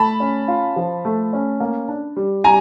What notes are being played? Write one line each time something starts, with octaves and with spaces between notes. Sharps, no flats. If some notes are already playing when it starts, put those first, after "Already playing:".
Already playing: A3 A5 B5
C#4
F4
F3
A3
C#4
A#3
D4
G3
G3 G#5 A#5